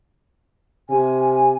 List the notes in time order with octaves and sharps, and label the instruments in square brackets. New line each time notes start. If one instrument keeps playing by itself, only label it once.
[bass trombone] C3 [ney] G#5